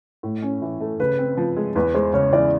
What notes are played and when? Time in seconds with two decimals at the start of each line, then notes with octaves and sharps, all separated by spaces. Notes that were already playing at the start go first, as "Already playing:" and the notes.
0.23 A2
0.42 C#4
0.62 E3
0.81 A3
1.00 C#3 B4
1.19 C4
1.37 F3
1.56 G#3
1.75 E2 B4
1.94 G#3 C5
2.13 C#3 C#5
2.33 E3 D5